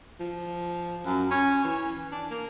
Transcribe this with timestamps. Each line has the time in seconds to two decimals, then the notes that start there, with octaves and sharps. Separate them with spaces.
0.20 F3
1.05 F#2
1.30 C#4
1.64 E3
2.12 D4
2.30 A#3